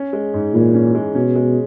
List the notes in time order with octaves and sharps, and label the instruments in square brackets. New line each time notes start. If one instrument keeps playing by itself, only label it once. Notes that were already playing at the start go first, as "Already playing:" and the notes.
Already playing: [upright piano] C#4
G#3
G#2
[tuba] A#2 [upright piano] E3
[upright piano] C#4
G#3
[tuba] B2 [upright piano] C#4
[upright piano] G#3